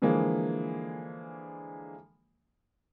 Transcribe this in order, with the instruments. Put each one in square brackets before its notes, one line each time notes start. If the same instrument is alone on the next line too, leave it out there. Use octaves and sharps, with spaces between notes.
[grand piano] D3 E3 F3 G#3 A#3